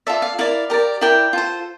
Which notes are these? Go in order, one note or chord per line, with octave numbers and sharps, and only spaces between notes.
F4 A4 D5 E5
F5
E4 A#4 D5 F5
G4 A#4 D5
E4 A#4 D5 G5
F4 A4 C5